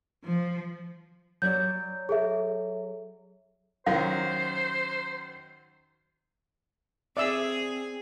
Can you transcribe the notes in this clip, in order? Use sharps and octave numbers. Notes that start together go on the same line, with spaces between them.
F3
F#3 C#5 D5 G6
G#4 A4 E5
F#2 D#3 F#3 C5 F5
C4 G#4 D5 E5 E6